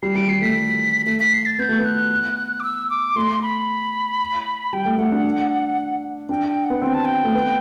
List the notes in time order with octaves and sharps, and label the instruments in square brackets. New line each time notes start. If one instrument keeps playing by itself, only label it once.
[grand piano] G3 [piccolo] C7
[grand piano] G3 [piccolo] D7
[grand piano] G3 [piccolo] C7
[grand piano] A3 [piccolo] B6
[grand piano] A3 [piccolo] B6
[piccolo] B6
C7
A6
[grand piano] B3 [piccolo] G6
[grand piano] A3
B3
[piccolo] F#6
D6
E6
D6
[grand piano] A3 [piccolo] C6
[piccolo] B5
[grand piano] G3 [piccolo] G5
[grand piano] A3
[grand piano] A3 [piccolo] F#5
[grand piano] D4
[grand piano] D4 [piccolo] G5
[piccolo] G5
F#5
[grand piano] B3
[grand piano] C4 [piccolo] G5
[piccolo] A5
G5
[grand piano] A3
B3